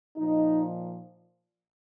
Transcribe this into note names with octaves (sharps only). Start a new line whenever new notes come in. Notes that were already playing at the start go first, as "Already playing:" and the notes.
A#2 F3 D#4